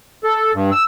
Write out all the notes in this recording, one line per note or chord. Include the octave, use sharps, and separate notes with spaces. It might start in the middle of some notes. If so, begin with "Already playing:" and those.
A4
G2
E6